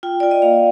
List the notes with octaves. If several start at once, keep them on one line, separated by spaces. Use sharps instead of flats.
F4 G5
F4 D5
D#5
A#3 F5